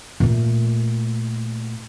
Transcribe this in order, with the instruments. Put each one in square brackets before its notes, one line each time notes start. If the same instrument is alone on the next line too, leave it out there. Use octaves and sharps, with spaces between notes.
[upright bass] A#2 A3